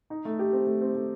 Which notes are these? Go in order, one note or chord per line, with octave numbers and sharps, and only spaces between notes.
D#4
A3
G4
C4
A3
C4
A3